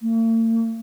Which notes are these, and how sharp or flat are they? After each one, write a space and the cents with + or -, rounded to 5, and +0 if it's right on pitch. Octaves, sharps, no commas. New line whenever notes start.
A#3 -45